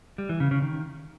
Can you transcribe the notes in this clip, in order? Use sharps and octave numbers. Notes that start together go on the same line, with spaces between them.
G3
E3
C#3
C#3
D#3